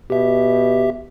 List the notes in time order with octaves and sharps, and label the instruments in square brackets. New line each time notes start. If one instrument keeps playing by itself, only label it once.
[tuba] B2 [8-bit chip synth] G4 E5